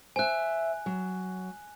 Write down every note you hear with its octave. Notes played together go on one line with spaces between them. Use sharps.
C5 E5 G#5 F#6
F#3